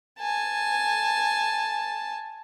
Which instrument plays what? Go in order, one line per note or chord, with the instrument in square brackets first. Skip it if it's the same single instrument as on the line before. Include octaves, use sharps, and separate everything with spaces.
[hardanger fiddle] G#5 A5